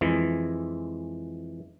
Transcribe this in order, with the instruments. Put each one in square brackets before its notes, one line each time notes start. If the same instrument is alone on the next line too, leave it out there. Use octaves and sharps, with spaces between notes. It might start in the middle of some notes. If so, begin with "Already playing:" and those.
[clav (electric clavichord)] F2 E3 G#3